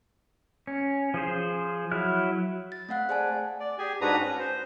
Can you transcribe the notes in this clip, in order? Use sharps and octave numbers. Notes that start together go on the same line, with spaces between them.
C#4
F3 G#4 C5
F#3 E4 F6 F#6
A6
A3 C4 F5 F#5 F#6
G#4 C5 D5 G#5 A5
D5
G4 G#4 G#5
G#2 D4 F#4 B4 A#5 D#6
C#4
C5